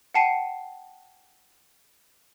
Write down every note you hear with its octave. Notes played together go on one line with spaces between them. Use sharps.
F#5 G5 A5 C7 C#7 D#7